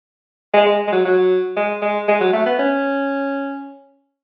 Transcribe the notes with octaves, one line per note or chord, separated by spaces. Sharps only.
G#3
G#3
G#3
F#3
F#3
G#3
G#3
G#3
F#3
A3
B3
C#4